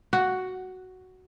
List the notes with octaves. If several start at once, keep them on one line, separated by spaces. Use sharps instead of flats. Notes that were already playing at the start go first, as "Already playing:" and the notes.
F#4